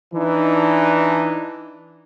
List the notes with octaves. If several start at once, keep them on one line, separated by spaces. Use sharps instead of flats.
E3 D4 D#4